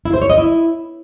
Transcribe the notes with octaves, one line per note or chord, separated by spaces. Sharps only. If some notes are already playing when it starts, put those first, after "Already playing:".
E4
C5
C#5
D#5
E4